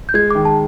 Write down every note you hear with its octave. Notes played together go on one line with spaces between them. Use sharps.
G6
G#3 G#6
D6
D#3
A5